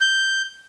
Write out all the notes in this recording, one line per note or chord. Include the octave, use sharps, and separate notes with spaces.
G6